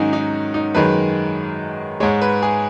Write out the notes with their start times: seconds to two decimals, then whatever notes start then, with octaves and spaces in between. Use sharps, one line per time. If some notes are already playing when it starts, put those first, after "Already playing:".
Already playing: G#2 D#3 F#3 C#4 D#4 F#4
0.13 D#4
0.54 D#4
0.75 F#2 D#3 G#3 B4
2.00 G#2 G#3 C#5
2.21 B4
2.42 G#4